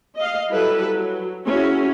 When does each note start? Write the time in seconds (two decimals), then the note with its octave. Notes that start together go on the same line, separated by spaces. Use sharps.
0.16 D#5 F5
0.51 F#3 G3 E4 A4 B4
0.95 F#3
1.45 C#4 E4 F#4 G#4